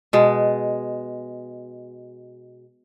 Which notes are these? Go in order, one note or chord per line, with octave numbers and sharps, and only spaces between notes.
B2 G#3